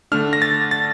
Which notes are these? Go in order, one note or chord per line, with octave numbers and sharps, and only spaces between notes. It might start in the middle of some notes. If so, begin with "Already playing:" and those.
D3 A3 D4 F6
A#6
A6
A6